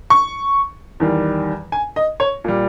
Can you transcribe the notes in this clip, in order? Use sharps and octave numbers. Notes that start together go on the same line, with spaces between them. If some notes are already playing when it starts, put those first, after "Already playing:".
C#6
E2 D#3 G3
G#5
D#5
C#5
A#2 G3